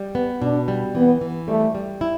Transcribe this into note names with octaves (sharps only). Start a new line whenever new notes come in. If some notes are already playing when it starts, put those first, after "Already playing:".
Already playing: G3
B3
B2 D4
G3
E3 B3
E3
G3 A3
G3
E4